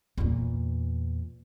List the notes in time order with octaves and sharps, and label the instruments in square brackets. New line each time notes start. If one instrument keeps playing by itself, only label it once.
[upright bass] E2 A#2